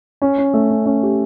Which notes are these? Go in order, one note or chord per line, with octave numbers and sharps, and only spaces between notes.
C#4
C#4
A3
C#4
C#4
G4